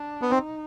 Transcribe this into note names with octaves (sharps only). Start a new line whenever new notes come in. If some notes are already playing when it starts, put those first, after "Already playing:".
Already playing: D4
B3
C4 D#4